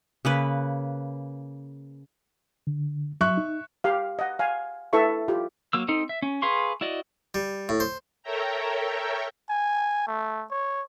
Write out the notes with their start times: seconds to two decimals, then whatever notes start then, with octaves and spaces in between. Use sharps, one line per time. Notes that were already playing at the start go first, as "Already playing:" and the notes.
0.25 C#3 A#3 B4
2.67 D3
3.21 F#3 E5 C#6 F#6
3.38 D#4
3.84 G4 F5
4.19 D#5 F#5
4.39 F5 G#5
4.93 E4 A4 B4 E5 C#6
5.28 F4 G4
5.73 F#3 A#3 E6
5.88 C4 D#4 A4
6.09 E5
6.22 C#4
6.42 G#4 B4 F5 C6 C#6
6.81 E4 F#4 D5 D#5
7.34 G3
7.69 A2
7.80 C5
8.23 A4 A#4 C#5 E5 G5 A#5
9.49 G#5
10.07 A3
10.51 C#5